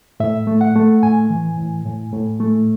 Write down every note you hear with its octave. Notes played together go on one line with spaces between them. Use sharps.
A2 E5
A3
F#5
A3
A2 G#5
E3
A2
A2
A2
A3